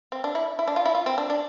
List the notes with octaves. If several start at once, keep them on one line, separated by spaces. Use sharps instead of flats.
C4
D4
E4
E4
D4
F4
E4
F4
C4
D4
D4